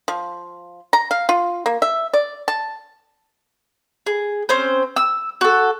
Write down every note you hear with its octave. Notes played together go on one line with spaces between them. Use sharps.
F3
A#5
F5
F4
A#3
E5
D5
A5
G#4
C4 C#4 C5
E6
F#4 A4